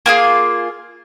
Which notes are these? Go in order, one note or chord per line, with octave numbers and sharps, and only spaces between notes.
A#3 F4 G#4